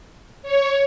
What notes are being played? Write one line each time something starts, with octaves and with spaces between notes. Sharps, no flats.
C#5